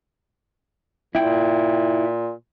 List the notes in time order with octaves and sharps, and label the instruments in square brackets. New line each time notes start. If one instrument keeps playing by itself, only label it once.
[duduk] A#2 [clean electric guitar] E4 G5